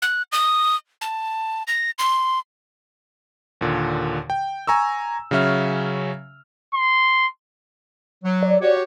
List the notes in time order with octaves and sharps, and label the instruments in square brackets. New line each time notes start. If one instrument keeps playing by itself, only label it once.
[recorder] F#6
D#6
A5
A#6
C6
[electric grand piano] D#2 A#2 D3
G5
G#5 A#5 C#6 E6
C#3 F#3 C#4 E5 F6
[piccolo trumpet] C6
[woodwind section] F#3
[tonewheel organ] D5
[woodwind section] F#4 G4 C#5